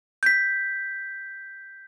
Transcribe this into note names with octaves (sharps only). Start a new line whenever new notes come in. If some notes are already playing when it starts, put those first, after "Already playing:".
G6 B6